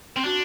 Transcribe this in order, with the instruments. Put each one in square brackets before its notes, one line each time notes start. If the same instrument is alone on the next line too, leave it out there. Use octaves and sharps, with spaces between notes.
[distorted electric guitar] C4
[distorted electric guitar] D4 [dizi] F#4